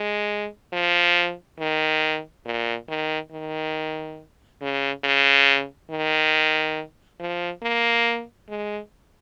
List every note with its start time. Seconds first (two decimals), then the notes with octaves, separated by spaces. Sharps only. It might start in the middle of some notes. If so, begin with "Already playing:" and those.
Already playing: G#3
0.73 F3
1.59 D#3
2.46 A#2
2.89 D#3
3.31 D#3
4.61 C#3
5.04 C#3
5.91 D#3
7.20 F3
7.63 A#3
8.49 G#3